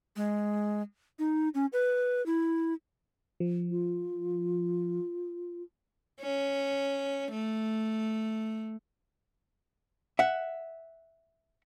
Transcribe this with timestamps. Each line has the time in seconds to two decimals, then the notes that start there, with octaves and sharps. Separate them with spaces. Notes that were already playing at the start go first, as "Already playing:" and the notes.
0.16 G#3
1.19 D#4
1.54 C#4
1.73 B4
2.26 E4
3.40 F3
3.71 F4
6.21 C#4
7.32 A3
10.19 E5 F#5